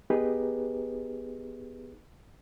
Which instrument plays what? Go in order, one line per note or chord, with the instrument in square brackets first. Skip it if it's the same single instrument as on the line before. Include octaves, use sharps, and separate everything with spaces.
[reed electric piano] B3 D#4 G4 G#4 B4